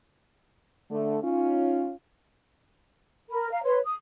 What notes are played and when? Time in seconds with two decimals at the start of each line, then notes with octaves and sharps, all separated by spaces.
0.91 D3 A3
1.23 C#4 D#4 F4
3.30 A#4 B5
3.52 F5 A#5
3.64 B4 C#5 C6
3.84 D#6